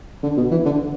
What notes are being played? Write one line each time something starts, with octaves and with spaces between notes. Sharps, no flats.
D3
B2
E3
D3